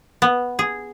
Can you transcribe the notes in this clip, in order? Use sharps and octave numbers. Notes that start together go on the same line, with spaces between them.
B3
G#4